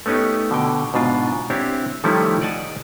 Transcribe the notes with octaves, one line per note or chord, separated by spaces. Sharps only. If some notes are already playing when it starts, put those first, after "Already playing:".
A3 B3 C#4 D#4 G4
B2 D3 G5
G#2 B2 D4 F4
C4 D4 E4 G4 C#5
D#3 F3 G3 A3 C#4 E4
D5 D#5 F#5 G#5 A5